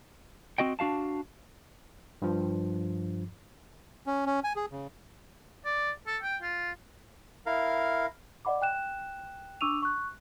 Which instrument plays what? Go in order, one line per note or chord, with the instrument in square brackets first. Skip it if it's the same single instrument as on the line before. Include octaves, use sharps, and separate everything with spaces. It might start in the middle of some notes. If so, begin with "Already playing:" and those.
[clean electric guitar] C4 F#4 D#5 G5
D4 F#4 F5 A5
[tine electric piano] G2 F3
[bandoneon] C#4
C#4
G#5
G#4
C#3
[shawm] D5
A4
G5
F4
[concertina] E4 A#4 F5
[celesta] D5 D#5 F#5 B5 D6
G5 F#6 E7
D4 C#6 D6 E6 D#7 F7
C#6 F#6